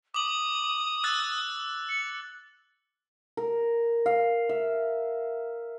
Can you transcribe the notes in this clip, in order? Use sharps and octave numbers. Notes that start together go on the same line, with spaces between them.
D6 D#6 F#7
E6 F#6 A6
C#7
A#4
F5
E5